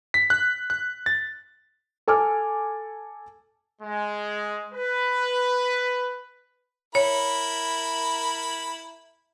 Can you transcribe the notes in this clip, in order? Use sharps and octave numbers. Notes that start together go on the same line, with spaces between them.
B6
F#6
F#6
A6
A4 G#5 D6 F6
G#3
B4
E4 A#4 C#5 B5